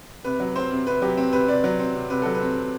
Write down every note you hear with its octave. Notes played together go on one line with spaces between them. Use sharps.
C3 B4
F#3
C4 C5
C3
C3 B4
F#3 G4
C4
C3 B4
C3 D5
F#3
C4
C3
C3 B4
F#3 A4
B4
C4
C3